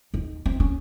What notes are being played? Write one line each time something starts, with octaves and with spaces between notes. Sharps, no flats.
D#2
C4
C#4